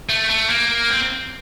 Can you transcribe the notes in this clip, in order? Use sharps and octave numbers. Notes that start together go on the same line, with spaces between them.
A3
A3
A#3
C4